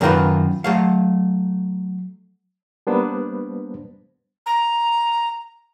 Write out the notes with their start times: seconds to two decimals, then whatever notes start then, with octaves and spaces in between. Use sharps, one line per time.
0.01 F#2 D#3 A#3 C#4 F4 B4
0.64 F#3 A3 F5
2.87 G3 A#3 B3 D4 B4 C5
4.46 A#5